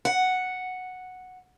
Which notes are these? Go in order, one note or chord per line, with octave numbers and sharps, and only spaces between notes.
F#5